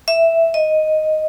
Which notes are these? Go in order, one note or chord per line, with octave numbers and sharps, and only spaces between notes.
E5
D#5